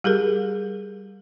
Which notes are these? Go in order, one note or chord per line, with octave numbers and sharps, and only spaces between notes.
G3 G4 G#4 A#4